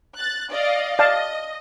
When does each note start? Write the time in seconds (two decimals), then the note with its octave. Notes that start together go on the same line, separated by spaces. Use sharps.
0.15 F#6 A6
0.50 D5 D#5 F5
0.99 D5 D#5 F5 A5